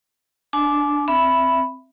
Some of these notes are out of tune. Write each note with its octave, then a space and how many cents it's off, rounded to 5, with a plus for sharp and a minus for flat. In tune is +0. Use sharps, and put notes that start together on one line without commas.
D4 +0 G#5 +40 D6 +0
C4 +0 E5 +5 B5 +0